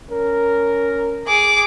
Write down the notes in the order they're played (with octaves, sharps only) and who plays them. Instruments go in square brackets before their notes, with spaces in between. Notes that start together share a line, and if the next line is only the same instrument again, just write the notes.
[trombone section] C#4 A#4
[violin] G#4 D6